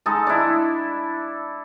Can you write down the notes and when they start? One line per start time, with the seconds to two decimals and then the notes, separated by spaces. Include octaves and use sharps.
0.06 G#3 D#4 A4
0.27 D4 E4